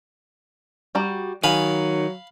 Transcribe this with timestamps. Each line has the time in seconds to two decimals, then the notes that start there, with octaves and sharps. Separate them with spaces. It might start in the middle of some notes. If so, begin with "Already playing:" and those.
0.95 G3 F#4 A#5
1.44 D#3 F#3 F5 G#5 B5